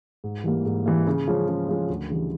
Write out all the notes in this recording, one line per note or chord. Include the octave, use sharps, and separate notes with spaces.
G#2
E3 G3 A#3
G#2
E3 G3 A#3
C#3
F3 G#3 C#4
C#3
F3 G#3 C#4
D2
C#3 E3 G3